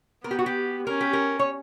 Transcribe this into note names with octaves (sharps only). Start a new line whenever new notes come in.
B3 A#4
G4
F#4
G4
C#4 A#4
G4
A#4
C#5